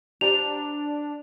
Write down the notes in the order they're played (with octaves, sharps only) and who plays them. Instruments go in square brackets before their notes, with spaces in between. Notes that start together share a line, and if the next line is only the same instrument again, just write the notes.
[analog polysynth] D4 [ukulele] G4 C5 A#5 [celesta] F7